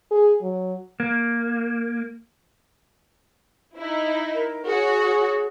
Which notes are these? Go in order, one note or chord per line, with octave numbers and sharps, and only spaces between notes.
G#4
F#3
A#3
D#4 E4
A#4
F#4 G#4 C#5